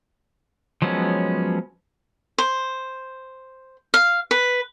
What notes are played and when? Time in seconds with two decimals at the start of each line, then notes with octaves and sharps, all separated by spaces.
0.82 F3 F#3 G#3 B3 C#4
2.38 C5
3.94 F5
4.31 B4